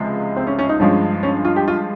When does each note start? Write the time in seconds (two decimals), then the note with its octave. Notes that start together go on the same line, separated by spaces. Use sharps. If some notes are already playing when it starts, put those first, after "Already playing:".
Already playing: C#2 C3 F3 G#3
0.36 C4
0.47 C#4
0.59 C#4
0.69 D#4
0.80 G2 F3 G#3 C#4
1.23 C#4
1.45 F4
1.56 G4
1.68 F4